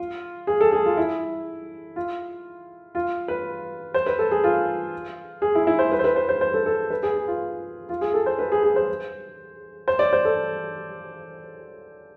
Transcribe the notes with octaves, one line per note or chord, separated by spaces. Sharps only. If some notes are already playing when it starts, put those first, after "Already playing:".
Already playing: F4
G#4
A4
G#4
F4
E4
F4
F4
B4
C5
B4
A4
G#4
F4
G#4
E4
E4
C5
B4
C5
B4
C5
C5
C5
A4
A4
B4
G#4
G#4
F4
F4
G#4
A4
C5
B4
G#4
G#4
C5
C5
D5
C5
A4